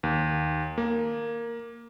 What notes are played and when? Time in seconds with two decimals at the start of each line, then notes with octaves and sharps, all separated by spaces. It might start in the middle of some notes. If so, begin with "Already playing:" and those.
0.03 D#2
0.78 A#3